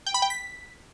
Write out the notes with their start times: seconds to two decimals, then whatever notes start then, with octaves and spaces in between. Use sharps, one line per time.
0.07 G5
0.14 B5
0.22 G5
0.30 B6